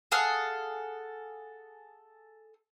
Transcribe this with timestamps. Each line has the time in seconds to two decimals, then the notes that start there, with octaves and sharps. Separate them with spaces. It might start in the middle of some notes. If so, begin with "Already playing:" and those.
0.12 G#4 A4 F5 F#5